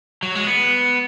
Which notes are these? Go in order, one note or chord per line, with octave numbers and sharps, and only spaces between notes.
F#3
G#3
B3